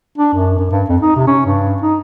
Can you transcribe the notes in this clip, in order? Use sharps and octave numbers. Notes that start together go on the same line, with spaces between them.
D4
F#2
F#2
G2
F2
D#4
C3
C#4
G2
D#4